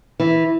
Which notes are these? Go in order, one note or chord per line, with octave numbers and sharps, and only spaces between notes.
E3